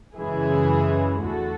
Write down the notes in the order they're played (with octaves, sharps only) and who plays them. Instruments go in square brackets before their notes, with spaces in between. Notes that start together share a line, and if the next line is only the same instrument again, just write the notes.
[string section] F#2 C#3 E3 G#3 E4 G#4
E2 D3 A3 F#4 A4